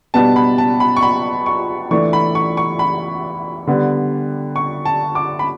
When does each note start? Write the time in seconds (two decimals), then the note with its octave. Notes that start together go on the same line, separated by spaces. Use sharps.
0.14 B2 G3 B3 D4 A5
0.36 B5
0.58 A5
0.80 B5
0.97 C#6
1.03 B5
1.46 C#6
1.91 E3 A3 D4 C#6
2.13 B5
2.35 C#6
2.57 C#6
2.79 B5
3.67 D3 G3 B3 D4
4.56 C#6
4.85 A5
5.15 D6
5.39 B5